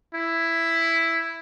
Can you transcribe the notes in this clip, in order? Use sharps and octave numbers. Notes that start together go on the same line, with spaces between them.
E4